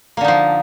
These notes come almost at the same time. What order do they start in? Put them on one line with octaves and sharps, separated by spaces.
A#3 D3 D#4 F3